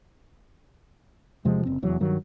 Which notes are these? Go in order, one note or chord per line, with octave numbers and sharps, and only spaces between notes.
E2 C3 F3 G#3
F#1 C4
F1 E2 F#3
G2 D#3 F#3